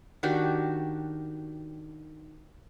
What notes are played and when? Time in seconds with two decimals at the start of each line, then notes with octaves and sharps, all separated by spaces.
0.23 D#3 D4 F#4 G4